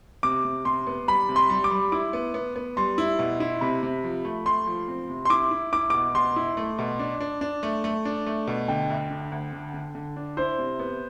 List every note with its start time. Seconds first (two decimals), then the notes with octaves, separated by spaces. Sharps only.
0.23 C3 D6
0.45 C3
0.65 C3 C6
0.87 B3
1.08 G3 B5
1.29 C3
1.36 C6
1.50 G3
1.64 D6
1.71 G3
1.92 E4 D6
2.13 B3
2.34 B3
2.56 B3
2.77 G3 C6
2.98 E4
3.19 B2
3.40 E4
3.61 C3 B5
3.83 C3
4.04 F3
4.25 A3
4.46 A3 C6
4.67 F3
4.88 C4
5.10 C3
5.25 C6
5.30 E4 D6
5.51 E4
5.73 E4 D6
5.90 B2 D6
6.15 B2 C6
6.36 E4
6.57 A3
6.79 B2
6.99 D4
7.21 D4
7.41 D4
7.63 A3
7.84 A3
8.05 D4
8.26 A3
8.47 B2
8.68 D3 G5
8.90 D2
9.10 D3
9.32 D2
9.53 D3
9.74 D3
9.95 D3
10.16 D4
10.37 E4 C5
10.58 C3
10.79 B3